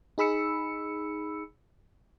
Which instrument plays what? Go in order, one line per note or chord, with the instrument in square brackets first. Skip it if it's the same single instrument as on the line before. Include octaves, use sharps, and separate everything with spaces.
[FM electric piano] D#4 G#4 B5 E6 C#7